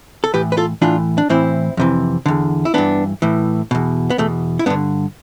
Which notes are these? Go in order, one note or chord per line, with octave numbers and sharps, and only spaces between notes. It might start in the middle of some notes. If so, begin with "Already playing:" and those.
A4
A2 E3 G4 B4
B4
F4 A4
A2 E3 D4 F4
D4
A2 E3 C4 E4
F2 C3 E3
E2 D3
E4
G2 E3 B3 D4
A2 E3
E2 B2
B3
E2 B2 A3
E4
G2 D3 B3 D4